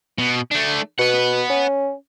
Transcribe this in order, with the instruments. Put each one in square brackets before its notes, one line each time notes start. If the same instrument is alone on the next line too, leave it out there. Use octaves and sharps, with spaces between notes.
[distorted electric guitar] B2
A3 D4
[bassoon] B2 [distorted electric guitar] B4 F#5
[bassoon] C#4